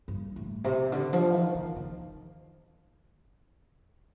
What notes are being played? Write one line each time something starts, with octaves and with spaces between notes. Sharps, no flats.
G2
A2
C3
D3
F3
D#3
D#3
D#3